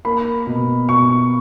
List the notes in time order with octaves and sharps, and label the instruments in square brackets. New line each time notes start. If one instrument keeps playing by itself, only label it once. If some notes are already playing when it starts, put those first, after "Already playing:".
[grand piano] A#3 B5
B2
B2 C#6